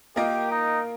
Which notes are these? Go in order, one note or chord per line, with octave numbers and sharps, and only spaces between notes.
A#3 F4 G4 A#4 D#5
D#4